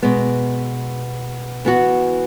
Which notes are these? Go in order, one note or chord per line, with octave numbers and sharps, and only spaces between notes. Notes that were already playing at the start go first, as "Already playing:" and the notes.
B2 G#3 B3
E3 B3 F#4